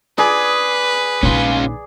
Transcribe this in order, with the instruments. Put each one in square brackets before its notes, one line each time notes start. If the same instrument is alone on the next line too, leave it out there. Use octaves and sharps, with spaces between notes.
[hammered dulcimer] G#4 D5 [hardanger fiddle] B4
[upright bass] A#1 D#3 [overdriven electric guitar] C#4 F4